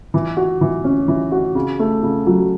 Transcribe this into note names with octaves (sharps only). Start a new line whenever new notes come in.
E3
F#4
E3
C#4
E3
F#4
C#3
A3
C#3
F#3